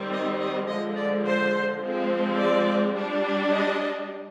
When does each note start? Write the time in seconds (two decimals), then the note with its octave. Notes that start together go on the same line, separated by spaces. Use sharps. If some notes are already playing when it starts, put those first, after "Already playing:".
Already playing: D#3 G3 C4
0.11 D#5
0.39 D#5
0.68 D3 F3 G#3 D#5
0.96 D5
1.25 C5
1.81 F3 G#3 C4
2.38 D5
2.94 G3 D4
3.52 D#5